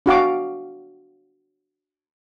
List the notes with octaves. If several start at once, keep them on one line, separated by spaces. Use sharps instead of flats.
D4 F#4 F5 D6